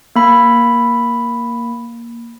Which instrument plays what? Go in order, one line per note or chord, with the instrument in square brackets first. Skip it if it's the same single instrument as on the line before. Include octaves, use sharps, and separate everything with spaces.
[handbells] A#3 B5